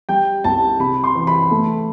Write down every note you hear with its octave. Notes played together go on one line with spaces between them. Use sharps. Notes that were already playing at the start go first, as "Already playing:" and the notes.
G3 G5
C2 A5
C3 B5
C6
E3
B5
A3